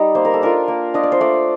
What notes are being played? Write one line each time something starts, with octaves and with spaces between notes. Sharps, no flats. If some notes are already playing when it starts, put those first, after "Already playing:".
Already playing: G3 D#4 D5
A#3 C5
A#4
A4
D4 F4 A#4
A#3
D4 F4 D#5
D5
C5
A3 D5